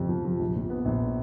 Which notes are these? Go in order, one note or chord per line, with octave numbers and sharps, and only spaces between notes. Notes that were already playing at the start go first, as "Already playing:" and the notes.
Already playing: F2 C3
F3
F3
A#1
A#2
B3
A#1